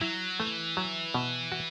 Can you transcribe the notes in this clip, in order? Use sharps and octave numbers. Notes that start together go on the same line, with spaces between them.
F#3 E4
E3 A3
F#3
B2
F#4